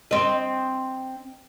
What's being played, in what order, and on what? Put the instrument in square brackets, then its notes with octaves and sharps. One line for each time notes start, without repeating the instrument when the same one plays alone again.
[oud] C4 D#5